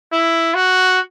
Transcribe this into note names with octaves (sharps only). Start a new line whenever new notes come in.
E4
F#4